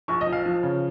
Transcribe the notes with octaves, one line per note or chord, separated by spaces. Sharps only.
A#1 C#6
D#5
F3
F5
F3
C#3